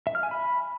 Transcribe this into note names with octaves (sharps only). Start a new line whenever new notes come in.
E5
F6
G#5
B5